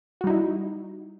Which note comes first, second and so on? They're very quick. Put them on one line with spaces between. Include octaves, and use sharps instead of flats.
F#4 G3 D#4 E4